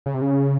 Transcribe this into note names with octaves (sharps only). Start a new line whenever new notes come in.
C#3
C3
C#3